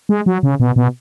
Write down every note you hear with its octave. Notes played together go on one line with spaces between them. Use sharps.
G#3
F#3
C#3
B2
B2